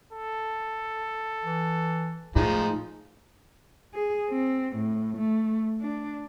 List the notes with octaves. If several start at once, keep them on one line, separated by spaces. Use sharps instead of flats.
A4
E3
A2 F3 G#3 D#4
G#4
C4
A2
A3
D4